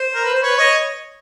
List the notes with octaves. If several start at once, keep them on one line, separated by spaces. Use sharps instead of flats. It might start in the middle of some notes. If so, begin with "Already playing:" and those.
Already playing: C5
A#4
B4
C5
B4 C#5
C#5 D#5